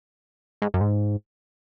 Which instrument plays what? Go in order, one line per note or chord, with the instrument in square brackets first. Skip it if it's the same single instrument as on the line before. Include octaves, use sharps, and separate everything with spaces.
[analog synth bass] G#2
F#2
G#2